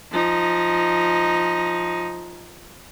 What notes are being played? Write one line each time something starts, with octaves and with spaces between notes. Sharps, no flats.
F3 D#4